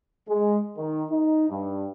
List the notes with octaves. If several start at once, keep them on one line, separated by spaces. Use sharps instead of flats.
G#3
D#3
D#4
G2